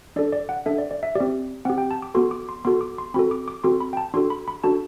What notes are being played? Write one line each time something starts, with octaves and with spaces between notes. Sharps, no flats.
D4 A4 D5
D5
F#5
D4 A4 E5
D5
D5
E5
C4 G4 D5
C4 G4 F#5
G5
A5
D6
B3 F#4 A4 C6
D6
C6
B3 F#4 A4 C6
D6
C6
C4 F#4 A4 B5
D6
D6
C4 F#4 A4 C6
B5
G5
A5
D4 F#4 A4 C6
B5
B5
D4 F#4 A4 A5